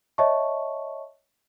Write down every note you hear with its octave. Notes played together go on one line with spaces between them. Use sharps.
C#5 D#5 E5 A5 C#6